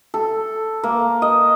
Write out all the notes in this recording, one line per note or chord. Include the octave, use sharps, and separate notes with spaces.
A4
A#3
D#5